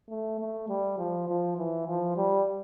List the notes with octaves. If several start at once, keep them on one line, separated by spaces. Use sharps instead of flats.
A3
A3
G3
F3
F3
E3
F3
G3